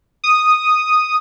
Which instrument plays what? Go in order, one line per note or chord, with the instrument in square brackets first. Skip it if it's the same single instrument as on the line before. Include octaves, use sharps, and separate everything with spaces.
[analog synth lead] D#6